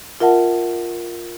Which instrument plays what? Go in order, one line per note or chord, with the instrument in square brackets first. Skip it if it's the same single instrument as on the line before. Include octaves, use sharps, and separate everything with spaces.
[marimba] F4 A#4 E5 F#5 A5